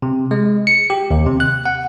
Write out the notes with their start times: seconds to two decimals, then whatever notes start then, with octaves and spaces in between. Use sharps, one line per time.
0.02 C3
0.31 G#3
0.67 C#7
0.90 G4
1.11 D#2
1.26 C3
1.40 F#6
1.66 F#5